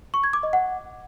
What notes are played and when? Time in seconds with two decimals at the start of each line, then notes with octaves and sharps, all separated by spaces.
0.14 C#6
0.24 G#6
0.33 D6
0.43 D#5
0.53 F#5